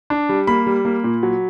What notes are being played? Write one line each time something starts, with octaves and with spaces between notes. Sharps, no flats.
D4
G3
A#3 B5
G3
A#3
A#2
F#3